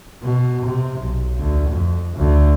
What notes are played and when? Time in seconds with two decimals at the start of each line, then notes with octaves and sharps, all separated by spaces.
0.22 B2
0.65 C3
1.01 B1
1.38 D2
1.69 F2
2.16 D2